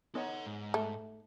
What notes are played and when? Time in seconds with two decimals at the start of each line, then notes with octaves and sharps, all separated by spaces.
0.15 B3 D#4 A4 C#5 F#5
0.46 G#2
0.74 A3